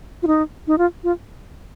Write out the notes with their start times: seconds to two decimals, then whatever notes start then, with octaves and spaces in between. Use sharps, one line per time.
0.23 F4
0.27 D#4
0.67 D#4
0.78 F4
1.04 F4